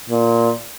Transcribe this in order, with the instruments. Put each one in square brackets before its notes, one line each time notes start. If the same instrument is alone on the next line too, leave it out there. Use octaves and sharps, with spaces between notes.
[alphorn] A#2